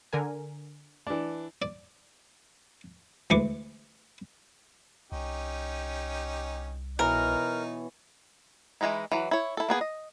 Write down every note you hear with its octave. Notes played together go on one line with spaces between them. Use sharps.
D3 A#4 G#5
E3 D4
D5
D2 E3 G#3 C#6 D6
C2 C#4 D#4 G4
B2 E3 D#4 A#4 C#5
E3 G3 G#3 D#4 E4
E3 F#3
E4 C#5
E4 A4
A#3 B3 G#4
D#5